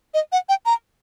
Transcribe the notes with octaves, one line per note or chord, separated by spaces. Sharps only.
D#5
F#5
G5
A#5